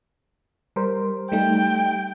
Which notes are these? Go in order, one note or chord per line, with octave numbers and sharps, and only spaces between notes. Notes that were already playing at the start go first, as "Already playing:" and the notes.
G3 A#4 C5
G3 A3 D#4 G5